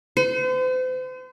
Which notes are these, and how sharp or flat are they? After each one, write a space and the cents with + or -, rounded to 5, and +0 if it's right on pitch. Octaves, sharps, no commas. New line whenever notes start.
C5 -40